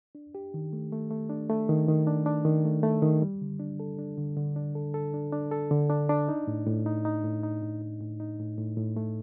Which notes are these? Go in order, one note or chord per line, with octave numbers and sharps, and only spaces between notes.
D4
G4
D#3
A3
A3
A3
D4
A3
D#3
D#3
D4
D4
D#3
A3
A3
D#3
G3
D3
D4
A4
D4
D3
D3
D4
A4
A4
D4
D4
A4
D3
D4
D4
D#4
A2
A2
D#4
D#4
A2
D#4
A2
D#4
A2
D#4
A2
A2
A2
A3